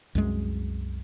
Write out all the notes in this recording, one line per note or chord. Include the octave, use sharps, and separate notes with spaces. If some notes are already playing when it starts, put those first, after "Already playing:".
C2 F#2 G#3